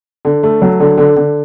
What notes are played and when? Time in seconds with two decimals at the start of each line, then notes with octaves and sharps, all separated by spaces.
0.25 D3
0.43 A3
0.62 F#3
0.80 D3
0.98 D3
1.16 D3